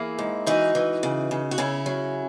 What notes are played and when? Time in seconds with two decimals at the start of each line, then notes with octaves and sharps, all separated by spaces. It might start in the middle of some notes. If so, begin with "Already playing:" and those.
Already playing: E3 A#3 E4 G#4
0.19 G#2
0.47 E3 D#4 F#4
0.75 E3
1.03 C#3
1.31 C#3
1.51 F#4
1.58 C#3 C#4 E4
1.86 F#3